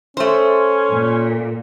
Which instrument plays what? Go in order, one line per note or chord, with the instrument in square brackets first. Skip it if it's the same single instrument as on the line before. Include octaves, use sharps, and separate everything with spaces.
[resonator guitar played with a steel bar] A3 C5 [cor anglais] C#4 [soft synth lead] C6
[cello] A#2